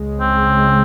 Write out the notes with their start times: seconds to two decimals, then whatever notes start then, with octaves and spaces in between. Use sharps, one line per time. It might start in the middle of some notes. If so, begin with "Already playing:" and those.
Already playing: C#2 C#3 G#3
0.20 C4